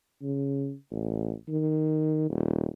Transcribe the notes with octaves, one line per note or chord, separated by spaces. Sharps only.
C#3
A1
D#3
D#1